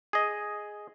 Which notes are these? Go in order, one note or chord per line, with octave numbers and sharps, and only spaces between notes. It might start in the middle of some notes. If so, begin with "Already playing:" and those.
G#4 D#5